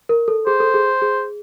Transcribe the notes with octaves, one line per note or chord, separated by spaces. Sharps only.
A#4
A4
G#4 C5
A4
G#4
G#4